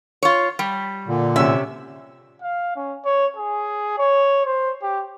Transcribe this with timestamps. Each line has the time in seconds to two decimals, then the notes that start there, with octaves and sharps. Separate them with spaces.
0.23 F4 C#5
0.59 G3
1.07 A#2 D3
1.36 C3 C#4 E5
2.42 F5
2.76 C#4
3.05 C#5
3.37 G#4
3.99 C#5
4.46 C5
4.82 G4